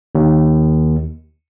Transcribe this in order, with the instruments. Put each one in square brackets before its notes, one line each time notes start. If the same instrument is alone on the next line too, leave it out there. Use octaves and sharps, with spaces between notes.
[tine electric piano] D#2